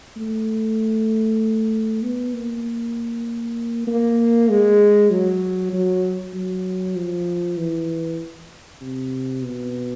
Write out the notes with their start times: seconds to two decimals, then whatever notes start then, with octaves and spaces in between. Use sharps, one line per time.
0.17 A3
2.02 B3
2.34 A#3
3.87 A#3
4.49 G#3
5.10 F#3
5.73 F#3
6.34 F#3
6.96 F3
7.57 E3
8.81 C3
9.42 B2